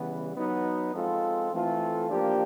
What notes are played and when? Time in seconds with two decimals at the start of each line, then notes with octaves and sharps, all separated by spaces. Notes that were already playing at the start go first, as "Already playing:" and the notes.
Already playing: C#3 E3 G3 B3
0.35 F#3 B3 D#4
0.93 F3 G#3 C4 F4 A4
1.51 E3 A3 C4 F4 A4
2.09 F3 A#3 D4 G4